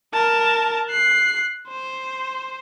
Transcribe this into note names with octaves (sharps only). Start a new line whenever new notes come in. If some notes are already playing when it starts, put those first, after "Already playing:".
A#4 A5
F#6 C7
C5